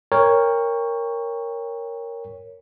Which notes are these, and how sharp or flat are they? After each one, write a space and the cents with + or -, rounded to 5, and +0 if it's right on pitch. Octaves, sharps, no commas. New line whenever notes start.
A#4 +0 C#5 +0 G5 +30